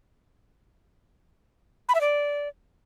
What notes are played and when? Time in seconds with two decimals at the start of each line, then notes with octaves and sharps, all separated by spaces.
1.89 B5
1.95 E5
2.01 D5